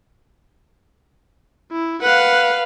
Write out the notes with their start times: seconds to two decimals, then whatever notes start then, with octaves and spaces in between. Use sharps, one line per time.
1.72 E4
2.02 B4 F5 F#5